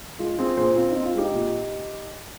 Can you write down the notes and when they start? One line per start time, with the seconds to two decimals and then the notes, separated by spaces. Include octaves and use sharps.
0.19 G#3 F4
0.39 C4 F4 G#4
0.57 A#2 G#4 C5
0.76 C4 F4
0.90 D#4
0.95 C4
1.05 F4
1.14 G#3 D#4 G4
1.33 A#2